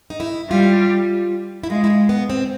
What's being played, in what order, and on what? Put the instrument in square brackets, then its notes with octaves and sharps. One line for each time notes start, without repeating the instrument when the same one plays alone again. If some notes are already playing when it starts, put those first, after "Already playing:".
[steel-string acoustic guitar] D#4
E4
[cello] G3 [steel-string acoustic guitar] F4
[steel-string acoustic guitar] E4
[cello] G#3 [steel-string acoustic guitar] F4
[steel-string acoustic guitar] E4
F4
B3
C4